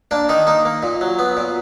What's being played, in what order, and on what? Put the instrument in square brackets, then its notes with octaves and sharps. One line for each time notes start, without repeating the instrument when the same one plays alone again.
[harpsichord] A#3 D4
D#3 D#4
A#3 D#4
A#3
A#2
F#3
B3
A#2